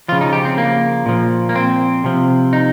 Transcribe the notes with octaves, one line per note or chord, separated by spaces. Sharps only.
C#3 F3 F4
D#4
G4
C4
A#3
A#2 F3
A#3
C4
C3 F3
D#4